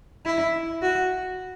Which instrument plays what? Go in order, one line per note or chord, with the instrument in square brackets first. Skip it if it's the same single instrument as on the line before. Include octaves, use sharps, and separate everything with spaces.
[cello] E4
F#4